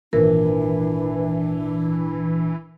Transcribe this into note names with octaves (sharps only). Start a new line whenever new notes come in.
G#1 A#2 E3 D4 A#4 B4